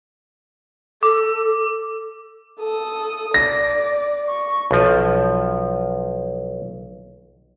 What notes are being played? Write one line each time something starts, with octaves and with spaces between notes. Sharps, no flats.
A4 D6
A4 D#6
D5 A#6
C#6
B1 F3